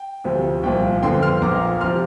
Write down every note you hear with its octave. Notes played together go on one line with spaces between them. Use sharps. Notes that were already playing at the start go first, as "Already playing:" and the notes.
Already playing: G5
D2 C3 F3
C2 A#2 F3 G5
G1 F2 D3 F3 G5 C6
C6 F6
A#1 A#2 F3 A#5 D6
C3 F3 C6 F6